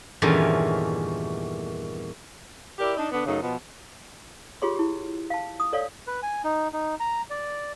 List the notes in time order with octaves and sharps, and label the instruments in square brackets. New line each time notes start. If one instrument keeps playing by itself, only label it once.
[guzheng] E2 G2 A#2 D#3 A3 C#4
[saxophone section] E4 G4 A#4 D5
D4 D#4
D3 B3 D4
F#2 C#3 A3 D#4
B2 F3
[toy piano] F4 G4 G#4 C#5 C6
E4 G4
F5 A5
D#6
A4 C#5 D5 F5
[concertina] B4
G#5
D#4
D#4
A#5
D5